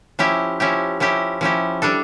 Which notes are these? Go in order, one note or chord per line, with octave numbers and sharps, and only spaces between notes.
F3 C#4 E4 G4
F3 C#4 E4 G4
F3 C#4 E4 G4
F3 C#4 E4 G4
G3 D4 A4